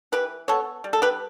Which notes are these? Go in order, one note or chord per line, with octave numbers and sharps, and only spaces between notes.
E3 G4 B4
B3 A4 C#5
G3
A4
G4 B4